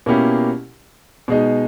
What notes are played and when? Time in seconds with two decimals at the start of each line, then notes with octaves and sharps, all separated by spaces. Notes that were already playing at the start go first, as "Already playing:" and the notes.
0.06 B2 A#3 C#4 E4 G4
1.28 B2 G#3 D#4